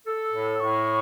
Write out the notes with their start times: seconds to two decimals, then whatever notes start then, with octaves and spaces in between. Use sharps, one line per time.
0.07 A4 E6
0.33 A2
0.55 E6
0.60 A2 C#6